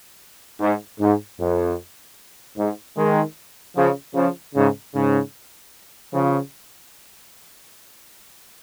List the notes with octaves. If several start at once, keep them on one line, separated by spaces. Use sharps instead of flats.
G#2
G#2
F2
G#2
D#3 G#3
C#3 F3
C#3 F3
G#2 C#3
G#2 C#3
C#3 F3